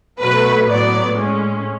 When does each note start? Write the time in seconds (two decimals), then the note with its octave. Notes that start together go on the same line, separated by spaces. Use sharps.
0.20 B2 F#3 A3 B4
0.68 A2 F#3 B3 D5
1.15 A2 G#3 C#4